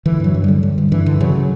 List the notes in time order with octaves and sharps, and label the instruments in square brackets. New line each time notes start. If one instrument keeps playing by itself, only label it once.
[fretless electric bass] D3 E3
G2 F#3
G2
D3 G3
D3
G2
G2 E3
D3
C#3 F#3